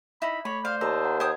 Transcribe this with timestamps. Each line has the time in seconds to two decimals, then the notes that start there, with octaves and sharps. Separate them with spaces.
0.22 D#4 E4 B5
0.45 A3 C#5 B5
0.65 C5 D5 F5
0.81 D#2 A5 A#5 D#6 E6
1.05 F#5
1.20 C5 D#5 G5 D#6 G#6